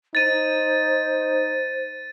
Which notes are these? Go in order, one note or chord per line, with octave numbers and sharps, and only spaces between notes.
D#4 C5 A6 D#7